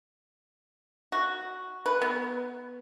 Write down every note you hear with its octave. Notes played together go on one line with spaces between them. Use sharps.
F#4
B4
B3